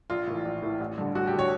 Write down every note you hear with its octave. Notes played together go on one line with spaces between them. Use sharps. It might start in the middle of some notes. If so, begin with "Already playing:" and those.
A#1 F4
A2 E3
A#1
A2 E3
A1
G2 D3
A1 F#4
G4
D3
C#5